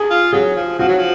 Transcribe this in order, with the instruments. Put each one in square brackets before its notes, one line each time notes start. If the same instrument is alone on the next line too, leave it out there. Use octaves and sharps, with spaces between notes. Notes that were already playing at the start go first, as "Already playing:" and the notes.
Already playing: [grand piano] G#4
[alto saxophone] F4
[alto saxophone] F#3 [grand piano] G#4
[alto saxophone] F3
[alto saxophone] F3 [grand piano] F#4
[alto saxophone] F#3
F3